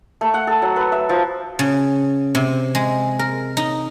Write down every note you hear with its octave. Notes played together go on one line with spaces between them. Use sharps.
A3
F#5
A4
F#3
B4
E5
F3
C#3
C3
G#3
A#4
D#4